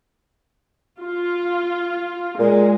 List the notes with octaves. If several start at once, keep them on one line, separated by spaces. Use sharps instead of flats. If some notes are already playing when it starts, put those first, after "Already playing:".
F4
A#2 G#3